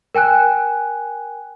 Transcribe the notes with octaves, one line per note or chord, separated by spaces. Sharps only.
A#4 G5 G#5 F#6